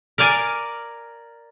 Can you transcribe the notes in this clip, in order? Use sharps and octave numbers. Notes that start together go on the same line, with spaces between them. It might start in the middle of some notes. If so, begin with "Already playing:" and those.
A#4 D5 F5 G#5